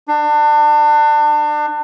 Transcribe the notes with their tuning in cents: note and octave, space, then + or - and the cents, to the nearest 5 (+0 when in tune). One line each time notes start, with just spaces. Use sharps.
D4 +30